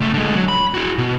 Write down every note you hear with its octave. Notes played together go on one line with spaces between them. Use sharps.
C#2 A3
D3 G#3
F#3
B5
E4 F#4
B2